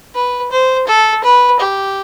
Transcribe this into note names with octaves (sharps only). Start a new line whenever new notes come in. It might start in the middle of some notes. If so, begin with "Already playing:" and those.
B4
C5
A4
B4
G4